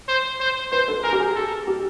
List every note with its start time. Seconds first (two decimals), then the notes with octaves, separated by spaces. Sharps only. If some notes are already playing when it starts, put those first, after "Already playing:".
0.09 C5
0.41 C5
0.72 B4 C5
0.88 A4
1.04 G#4 A#4
1.12 G4
1.20 G#4
1.35 A4
1.67 G4